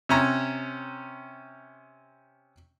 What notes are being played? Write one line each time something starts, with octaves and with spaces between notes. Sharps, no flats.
C3 C#4 A#5